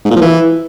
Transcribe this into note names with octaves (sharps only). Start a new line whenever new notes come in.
G#2
A#2
F3
E3